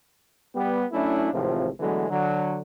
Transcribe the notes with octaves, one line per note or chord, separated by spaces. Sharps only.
G3 B3 G4
F#3 A3 C#4 D4 E4
G#1 A2 C3 E3 F3 F4
D3 E3 F#3 G#3 A3 B3
D3 F#3